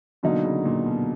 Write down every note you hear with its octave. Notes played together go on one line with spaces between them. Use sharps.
B2 D3 F#3 A#3 D#4
C#3
A#2
B2